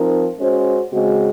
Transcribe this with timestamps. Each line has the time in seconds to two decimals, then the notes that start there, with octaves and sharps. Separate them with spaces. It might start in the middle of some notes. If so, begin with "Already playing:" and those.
Already playing: F3 C4 D#4 A#4
0.39 G#3 C#4 F#4 C5
0.92 C#3 G#3 C4 F#4